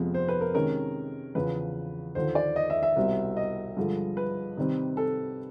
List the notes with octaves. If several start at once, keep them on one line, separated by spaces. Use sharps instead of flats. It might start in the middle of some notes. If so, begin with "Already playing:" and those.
Already playing: F2 C3 F3 G#3 B3
C5
B4
A#4
C3 D#3 G#3 C#4 A#4
E2 C#3 F3 B4
D#2 D3 F3 C5
D5
D#5
E5
E5
C2 B2 G3 C4
D#5
G2 D3 F3 G#3
B4
C3 D#3 G3 C4
A4